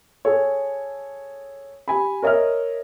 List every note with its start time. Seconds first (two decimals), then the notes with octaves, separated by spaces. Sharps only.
0.25 G#4 A4 C#5
1.88 G4 G#5 B5
2.22 A#4 C#5 D#5 E5 F6